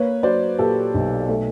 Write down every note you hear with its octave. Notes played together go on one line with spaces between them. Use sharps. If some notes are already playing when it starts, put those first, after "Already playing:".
Already playing: A#3 B4 C#5
F#3 C5 D5
A#2 G4 A4
B1
A3